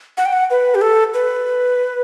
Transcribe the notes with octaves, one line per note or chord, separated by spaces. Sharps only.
F#5
G5
F#5
B4
G4
A4
B4